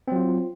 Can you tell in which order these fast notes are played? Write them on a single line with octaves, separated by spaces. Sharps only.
C4 F#3 F4